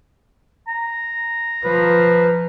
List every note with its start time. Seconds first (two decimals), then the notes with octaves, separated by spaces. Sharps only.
0.68 A#5
1.65 F3 B4